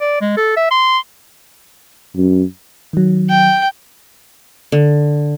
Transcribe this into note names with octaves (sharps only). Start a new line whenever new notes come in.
D5
G#3
A4
E5
C6
F#2
D#3 F#3
G5
D3